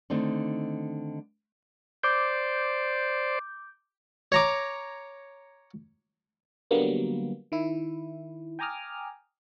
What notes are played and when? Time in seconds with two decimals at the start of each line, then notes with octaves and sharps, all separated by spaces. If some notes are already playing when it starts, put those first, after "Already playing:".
0.10 D3 D#3 A3 C4 D#4
2.03 C5 D5 D6 G6
4.32 C#5 A#5 D6
6.71 D3 F#3 G3 A#3 B3
7.52 D#3 E4
8.59 G5 G#5 A#5 D6 D#6 F6